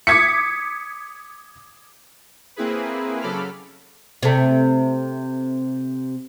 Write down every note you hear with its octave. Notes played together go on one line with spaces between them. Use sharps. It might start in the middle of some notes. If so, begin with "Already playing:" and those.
D6 D#6 G#6 B6 C#7
A#3 C4 E4 G#4 B4
C#3 F#3 A4 B5 D6 F6
C3 A3